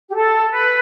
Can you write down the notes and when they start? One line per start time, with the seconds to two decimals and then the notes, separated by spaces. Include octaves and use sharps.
0.10 G4
0.15 A4
0.52 B4